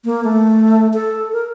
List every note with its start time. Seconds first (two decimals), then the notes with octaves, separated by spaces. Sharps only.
0.05 A#3
0.24 A3
0.94 A4
1.33 A#4